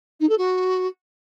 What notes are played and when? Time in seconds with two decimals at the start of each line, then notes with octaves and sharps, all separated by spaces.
0.20 D#4
0.29 A4
0.38 F#4